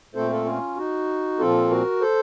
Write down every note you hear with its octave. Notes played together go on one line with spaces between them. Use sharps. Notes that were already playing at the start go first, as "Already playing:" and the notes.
A#2 A3 C4 A4 C5
F4 A4
C#4 F4
D#4 F#4
A#2 F3 C4 F4 A4
F#4 A#4
A4 C5